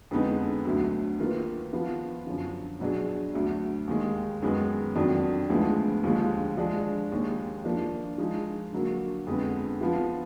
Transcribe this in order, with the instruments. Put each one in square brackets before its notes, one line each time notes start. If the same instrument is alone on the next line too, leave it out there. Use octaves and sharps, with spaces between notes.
[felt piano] F2 D3 G#3 B3 D#4
D2 D3 F#3
D#3 A#3 F4 B4
F3 B3 F4
F#2 D3 F3
B2 F#3 D4 G#4
D2 D3 F#3
D#2 D#3 G#3
F#2 D#3 G#3 B3
F2 D#3 F#3 D4
D2 D3 F3 G#3 B3
D#2 D3 F3 G#3
F3 G#3 D4
D#2 D#3 G#3
F3 A#3 D4
F3 G#3 D#4
D3 F#3 A#3
F2 D3 G#3 B3
F3 B3 F4